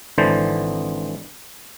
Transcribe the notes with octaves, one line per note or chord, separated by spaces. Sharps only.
G#1 D3 E3 C5 A5